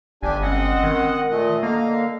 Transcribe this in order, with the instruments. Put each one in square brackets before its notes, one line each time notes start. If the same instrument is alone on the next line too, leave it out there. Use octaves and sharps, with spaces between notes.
[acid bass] G1 [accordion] D4 G4 G#5
[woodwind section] G#3 C4 C#4 [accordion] D#5 F#5
[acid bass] D#3
[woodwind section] A#2 [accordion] A3 D#5
[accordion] D3 [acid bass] A#3 [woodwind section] D#5 F5 A#5